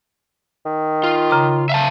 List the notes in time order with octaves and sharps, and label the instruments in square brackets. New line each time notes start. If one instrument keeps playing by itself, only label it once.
[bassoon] D#3
[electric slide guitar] F4
[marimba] C#3 A#5 D6
[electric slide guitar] E5 F5 A5